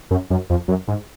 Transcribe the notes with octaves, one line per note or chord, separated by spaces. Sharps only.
F#2
F#2
F2
F#2
G#2